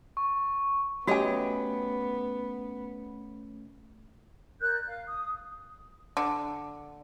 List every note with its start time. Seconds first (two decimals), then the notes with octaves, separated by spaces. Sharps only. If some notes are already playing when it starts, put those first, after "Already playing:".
0.17 C#6
1.07 A3 B3 C#4 F#4 G4 C#5 D#5 G#5
4.60 A#4 D5 F#6 G6
4.86 F5
5.08 D#6
6.17 D3